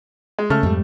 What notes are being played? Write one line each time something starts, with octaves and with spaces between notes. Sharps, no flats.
G#3
C#3 A3 F6
F2 G#2 G3